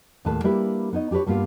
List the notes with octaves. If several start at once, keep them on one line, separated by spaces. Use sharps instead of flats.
D#2 A2 G#4 B4 A5
G3 A#3 D4 E4 G4 B4
B3 D#4 C#5 D#5
D4 G4 A4 B4 C#5
G2 G3 A#3 B3 F4